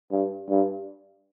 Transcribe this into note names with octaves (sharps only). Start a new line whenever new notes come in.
G2
G2